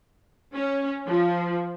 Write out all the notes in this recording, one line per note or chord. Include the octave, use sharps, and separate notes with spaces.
C#4
F3